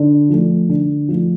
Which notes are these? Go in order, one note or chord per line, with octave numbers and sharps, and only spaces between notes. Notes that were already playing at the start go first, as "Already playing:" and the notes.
Already playing: D3
F3 A3
D3
F3 A3